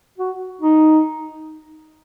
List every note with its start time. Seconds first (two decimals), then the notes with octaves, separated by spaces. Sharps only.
0.18 F#4
0.61 D#4